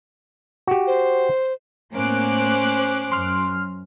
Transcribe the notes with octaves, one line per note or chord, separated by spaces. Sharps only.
F#4 G4
C5
A2 A#3 B3 C#4 C5 D6 F#6
F#2 C6 F6